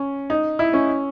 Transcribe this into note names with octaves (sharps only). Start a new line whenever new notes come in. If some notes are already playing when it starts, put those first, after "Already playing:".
Already playing: C#4
D#4
E4
C#4